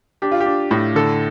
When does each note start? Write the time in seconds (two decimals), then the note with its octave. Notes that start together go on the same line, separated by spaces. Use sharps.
0.22 D4 G4
0.32 F4
0.40 G4
0.46 D4
0.71 A2
0.95 D3 A4